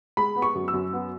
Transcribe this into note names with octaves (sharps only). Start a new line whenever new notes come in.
G#3 B5
B3
C#6
F#2
E6
F#2
B3